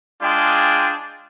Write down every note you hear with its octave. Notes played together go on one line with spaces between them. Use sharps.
G#3 D4 F4 G#4 G5